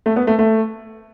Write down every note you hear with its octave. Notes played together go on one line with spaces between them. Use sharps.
A3
B3
A3
A3